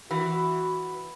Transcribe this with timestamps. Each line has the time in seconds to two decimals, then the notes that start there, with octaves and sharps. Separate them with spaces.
0.11 E3 F#4